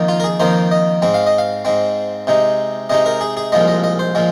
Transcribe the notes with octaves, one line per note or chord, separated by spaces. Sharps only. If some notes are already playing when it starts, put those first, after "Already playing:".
Already playing: F2 D#3 A#3 D#4
F4
A#4
G#4
F2 D#3 A#3 D#4 C5
D#5
G#2 G#3 C4
F5
D#5
F5
G#2 G#3 C4
C3 G#3 D#4
C3 G#3 D#4 D#5
A#4
G#4
G#4
C2 A#2 F3 G#3 D#5
D#5
D#5
C5
A#2 F3 G#3